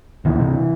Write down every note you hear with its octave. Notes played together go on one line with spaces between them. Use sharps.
D2 E3
C3